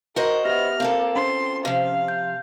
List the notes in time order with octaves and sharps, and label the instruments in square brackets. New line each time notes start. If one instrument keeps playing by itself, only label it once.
[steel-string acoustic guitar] F#4 C5 D#5 [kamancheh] A#4
[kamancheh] B3 F6 [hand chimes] G4 E5 A#6
[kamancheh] A#3 [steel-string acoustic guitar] C4 F4 A4 [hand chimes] F5
[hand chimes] C#4 C5 [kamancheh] C6
[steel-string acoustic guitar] C3 F3 [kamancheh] F5
[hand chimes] G6